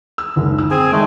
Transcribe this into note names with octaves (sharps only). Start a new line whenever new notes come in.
E6
F#1 D2 G#2
E6
C4 G#4 G#5
G#1 G#3 A3